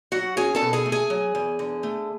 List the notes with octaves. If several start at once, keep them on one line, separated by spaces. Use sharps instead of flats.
F#3 F#4 F#5
C#4 G#4 G#5
A4 A5
B2
G#4 G#5
A3
G#4 G#5
F#3
E2
D3
A3